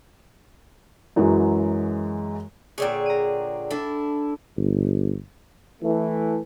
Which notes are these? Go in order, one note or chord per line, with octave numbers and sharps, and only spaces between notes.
F#2 E3 F#3 G#3
A#2 D3 G#4 C#5 G5
A#5 D#7
D4 E4 A4
G1
E3 A3